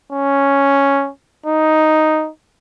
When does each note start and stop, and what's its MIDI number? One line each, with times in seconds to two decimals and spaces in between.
0.12 1.10 61
1.46 2.29 63